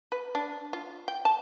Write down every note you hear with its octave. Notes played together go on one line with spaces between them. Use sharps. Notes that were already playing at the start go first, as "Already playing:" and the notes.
B4
D4
F4
G5
A5